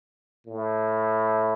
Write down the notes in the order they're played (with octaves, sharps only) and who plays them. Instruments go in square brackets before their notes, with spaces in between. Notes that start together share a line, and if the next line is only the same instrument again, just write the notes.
[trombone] A2